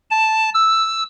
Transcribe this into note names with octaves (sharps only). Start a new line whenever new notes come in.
A5
E6